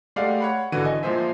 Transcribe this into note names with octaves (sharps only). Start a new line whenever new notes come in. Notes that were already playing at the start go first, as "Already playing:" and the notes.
G#3 A3 G4 D5 F5 F#5
C#5 F#5 B5
G#1 D3 E3 F#4 D#7
D#5 G#5
A#2 F3 G#3 G#4 C5 E5